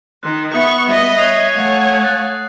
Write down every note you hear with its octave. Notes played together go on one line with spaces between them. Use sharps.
D#3 C6 F#6
B3 E5 C#6 D#6
G3 D#5 E5
C#5 G#5 F#6 C7 F7
A3 F5 F#5
F#6 A6